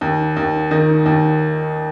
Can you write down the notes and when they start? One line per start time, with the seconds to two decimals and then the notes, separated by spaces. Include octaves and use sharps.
0.01 D#2
0.36 D#2
0.71 D#3
1.06 D#2